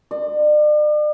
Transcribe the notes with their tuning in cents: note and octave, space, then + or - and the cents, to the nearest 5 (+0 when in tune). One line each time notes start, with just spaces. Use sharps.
D5 +40